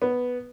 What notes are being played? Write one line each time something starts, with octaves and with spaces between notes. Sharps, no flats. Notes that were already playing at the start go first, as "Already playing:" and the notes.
B3